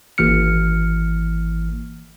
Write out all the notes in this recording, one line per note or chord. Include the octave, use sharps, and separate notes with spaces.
G#1 E3 A#3 F6 C#7